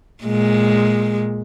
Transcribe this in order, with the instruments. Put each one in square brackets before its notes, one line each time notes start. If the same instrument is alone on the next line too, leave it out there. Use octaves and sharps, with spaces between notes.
[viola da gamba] A#2 G#3